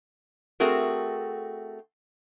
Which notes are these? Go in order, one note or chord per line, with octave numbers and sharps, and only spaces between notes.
A3 C4 F#4 G#4 A#4